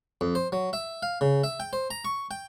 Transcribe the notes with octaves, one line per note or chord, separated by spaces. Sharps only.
F2
C5
F#3
E5
F5
C#3
E5
G5
C5
A#5
C#6
G5